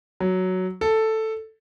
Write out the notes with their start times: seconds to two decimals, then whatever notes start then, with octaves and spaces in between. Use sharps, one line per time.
0.20 F#3
0.81 A4